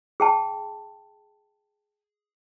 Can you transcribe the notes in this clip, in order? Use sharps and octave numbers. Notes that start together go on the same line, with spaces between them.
G#4 G5 A5